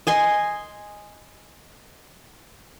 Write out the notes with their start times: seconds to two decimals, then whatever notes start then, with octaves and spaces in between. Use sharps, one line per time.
0.07 D#5 G#5 C6